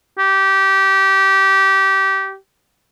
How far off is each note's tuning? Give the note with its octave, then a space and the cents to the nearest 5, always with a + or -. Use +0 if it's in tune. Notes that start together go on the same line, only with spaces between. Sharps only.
G4 -20